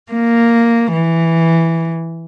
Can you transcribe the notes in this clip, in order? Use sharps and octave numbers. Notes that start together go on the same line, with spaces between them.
A#3
E3